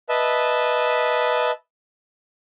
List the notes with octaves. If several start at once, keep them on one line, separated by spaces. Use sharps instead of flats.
B4 D#5 E5 A5